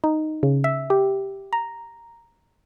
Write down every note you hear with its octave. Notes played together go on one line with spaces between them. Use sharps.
D#4
C#3
E5
G4
A#5